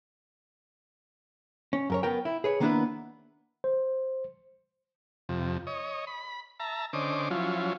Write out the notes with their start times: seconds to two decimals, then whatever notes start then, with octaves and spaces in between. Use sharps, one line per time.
1.73 C#4
1.90 F#2 A#4 C#5
2.03 B3 A#4 G5
2.25 E4
2.44 G#4 B4 C#5
2.60 D#3 A#3 B3 D4 E4 B4
3.64 C5
5.29 F2 C3
5.67 C#5 D#5
6.07 B5
6.60 E5 A5 A#5
6.93 D3 C#4 C5 D#5 D6
7.30 F3 F#3 C#4 E4 F4